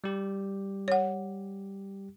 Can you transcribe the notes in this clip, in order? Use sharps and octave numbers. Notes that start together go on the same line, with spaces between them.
G3 G4
C#5 F#5